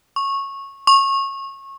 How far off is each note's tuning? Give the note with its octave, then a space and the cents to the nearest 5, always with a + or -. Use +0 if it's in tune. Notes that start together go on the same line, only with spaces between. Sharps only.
C#6 -15
C#6 -25